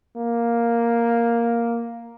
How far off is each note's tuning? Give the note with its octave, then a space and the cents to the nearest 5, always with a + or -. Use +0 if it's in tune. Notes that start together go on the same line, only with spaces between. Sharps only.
A#3 +0